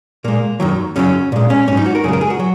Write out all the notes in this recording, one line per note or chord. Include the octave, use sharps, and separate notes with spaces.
A#2 G#3 A#3
F#2 D#3 F#3
F#2 C#3 F#3 C#4
A#2 G#3
C#4
G#2 F#3 C#4 D#4
F#4
A#4
F#2 C#3 G#3 G#4
A#4
G#4
F#4
F#3